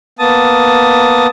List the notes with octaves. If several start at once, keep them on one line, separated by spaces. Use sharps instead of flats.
A#3 B3 A5 D#6